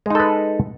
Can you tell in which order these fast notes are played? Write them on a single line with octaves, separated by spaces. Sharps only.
G#3 D#4 A4 B4